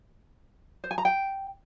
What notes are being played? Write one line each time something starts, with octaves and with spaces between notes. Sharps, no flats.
C5
G#5
A#5
G5